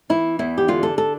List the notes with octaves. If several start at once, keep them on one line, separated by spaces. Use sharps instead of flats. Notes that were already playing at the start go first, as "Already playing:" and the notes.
E3 E4
E2 E4
G4
D3 F4
A4
A4